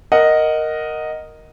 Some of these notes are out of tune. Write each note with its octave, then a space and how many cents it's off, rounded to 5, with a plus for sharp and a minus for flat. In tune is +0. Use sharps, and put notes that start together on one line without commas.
A#4 +0 D#5 +0 F#5 +0